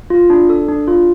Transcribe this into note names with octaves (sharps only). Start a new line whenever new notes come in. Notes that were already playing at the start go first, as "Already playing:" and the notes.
F4
D4
A4
D4
F4